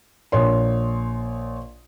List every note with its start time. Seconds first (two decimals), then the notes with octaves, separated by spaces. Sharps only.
0.32 A#1 C#5 C6